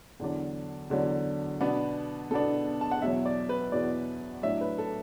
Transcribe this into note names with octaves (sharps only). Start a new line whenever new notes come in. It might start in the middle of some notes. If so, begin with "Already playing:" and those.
E2 D3 F#3 D4
E2 D3 F#3 D4
B2 B3 D4
B2 B3 D4 A4
A5
F#5
E2 B2 F#3 E5
D5
B4
E2 B2 F#3 D5
A2 F#3 D4 E5
B4
A4